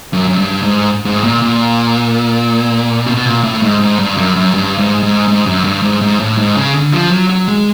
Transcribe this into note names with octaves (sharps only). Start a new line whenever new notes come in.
F#2
F#2
G2
G#2
G#2
A2
A#2
A#2
B2
A#2
A2
G#2
G#2
G2
F#2
F#2
G2
G#2
G#2
G#2
F#2
G2
G#2
G#2
A2
G#2
C#3
D3
F3
F#3
F#3
G#3